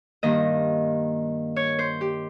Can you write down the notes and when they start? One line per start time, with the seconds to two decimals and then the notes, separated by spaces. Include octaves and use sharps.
0.23 G2 D#3 A#3 D#5
1.56 C#5
1.79 C5
2.01 G4